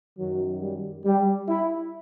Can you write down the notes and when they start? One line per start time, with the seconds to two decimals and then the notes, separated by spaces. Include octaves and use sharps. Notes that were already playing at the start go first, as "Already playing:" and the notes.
0.18 F#2 D#3 F#3
0.62 G3
1.05 G3
1.48 E4